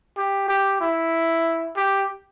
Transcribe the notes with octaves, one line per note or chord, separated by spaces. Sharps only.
G4
G4
E4
G4